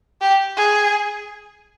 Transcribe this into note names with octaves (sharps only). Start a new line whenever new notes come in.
G4
G#4